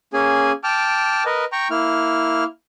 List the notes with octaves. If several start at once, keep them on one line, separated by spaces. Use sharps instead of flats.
A#3 C#4 G#4 G#5
G5 A5 D6 F6
A#4 B4 D#5
G5 A#5 C#6
A#3 E4 F6